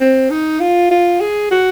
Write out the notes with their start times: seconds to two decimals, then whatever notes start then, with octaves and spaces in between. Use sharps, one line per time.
0.01 C4
0.31 D#4
0.61 F4
0.91 F4
1.21 G#4
1.51 F#4